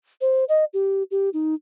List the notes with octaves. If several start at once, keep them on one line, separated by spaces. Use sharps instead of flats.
C5
D#5
G4
G4
D#4